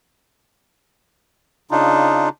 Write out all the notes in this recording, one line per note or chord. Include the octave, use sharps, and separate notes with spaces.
C#3 D4 D#4 F4